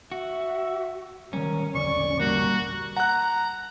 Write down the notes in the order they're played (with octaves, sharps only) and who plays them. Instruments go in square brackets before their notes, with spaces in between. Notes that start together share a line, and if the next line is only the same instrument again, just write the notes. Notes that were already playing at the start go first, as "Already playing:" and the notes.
[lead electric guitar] F#4 [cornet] E5
[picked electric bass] D#3 F#3 G3 [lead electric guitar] C#4 [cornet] A#4
[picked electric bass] E1 A#1 D3 [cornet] D5 [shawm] C#6
[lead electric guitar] G3 A#3 [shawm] F#4 [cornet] A#4
[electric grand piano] F#5 F#6 [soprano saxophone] A#5